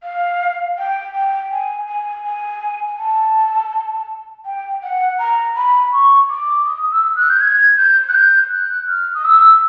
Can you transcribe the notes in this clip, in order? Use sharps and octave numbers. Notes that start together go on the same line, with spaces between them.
F5
G5
G5
G#5
G#5
G#5
A5
G5
F#5
A#5
B5
C#6
D6
D#6
E6
F#6
G6
G#6
G6
F#6
G6
F#6
F6
D#6
E6